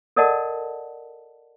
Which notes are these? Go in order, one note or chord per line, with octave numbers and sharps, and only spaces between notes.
A4 A#4 D5 D#5 F#5 A5